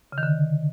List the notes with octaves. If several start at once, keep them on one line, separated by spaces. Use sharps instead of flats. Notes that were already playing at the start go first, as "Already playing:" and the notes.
C#3
D#3
D3